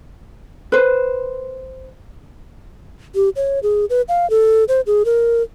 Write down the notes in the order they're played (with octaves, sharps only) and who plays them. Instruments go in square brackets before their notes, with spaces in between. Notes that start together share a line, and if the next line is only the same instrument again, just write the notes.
[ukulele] B4 C5
[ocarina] G4
C#5
G#4
B4
F5
A4
C5
G#4
A#4